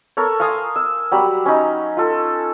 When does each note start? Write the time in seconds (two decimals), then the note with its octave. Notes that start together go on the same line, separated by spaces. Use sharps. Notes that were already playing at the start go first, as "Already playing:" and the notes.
0.17 A4 A#4 C#5
0.40 F5 G#5 C6 D#6
0.76 E6
1.12 F#3 G3 A#5 B5
1.46 C#4 D#4
1.97 F4 A4